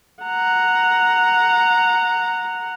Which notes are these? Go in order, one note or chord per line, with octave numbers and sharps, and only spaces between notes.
F#5 A#5